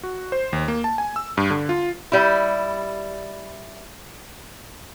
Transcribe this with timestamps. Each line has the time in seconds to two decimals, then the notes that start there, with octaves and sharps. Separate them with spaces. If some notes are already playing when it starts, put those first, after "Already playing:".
0.03 F#4
0.32 C5
0.53 D#2
0.68 A#3
0.84 A5
0.98 G#5
1.16 E6
1.37 G2
1.50 D3
1.69 F4
2.12 G3 E4